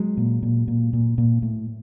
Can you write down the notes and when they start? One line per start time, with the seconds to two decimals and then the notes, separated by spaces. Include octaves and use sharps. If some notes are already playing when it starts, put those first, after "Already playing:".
Already playing: F#3 G#3
0.17 A#2
0.43 A#2
0.68 A#2
0.93 A#2
1.18 A#2
1.42 A2